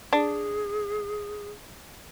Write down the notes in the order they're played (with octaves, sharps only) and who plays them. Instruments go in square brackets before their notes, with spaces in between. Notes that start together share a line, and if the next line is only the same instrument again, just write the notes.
[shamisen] D4 [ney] G#4